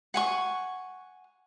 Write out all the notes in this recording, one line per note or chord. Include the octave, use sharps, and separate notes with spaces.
F#5 G#5 C#6